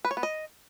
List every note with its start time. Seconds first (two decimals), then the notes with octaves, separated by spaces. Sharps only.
0.05 B4
0.11 C#5
0.17 B3
0.23 D#5